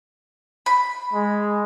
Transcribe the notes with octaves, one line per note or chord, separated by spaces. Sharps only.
B5
G#3